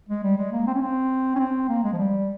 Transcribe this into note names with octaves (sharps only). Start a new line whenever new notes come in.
G#3
G3
G#3
A#3
C4
C#4
C4
C#4
C4
A#3
G#3
F3
G3